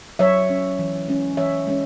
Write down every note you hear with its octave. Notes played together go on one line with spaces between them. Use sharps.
F#3 C#5 E5
C#4
E3
G#3 C#4
E3 C#5 E5
G#3 C#4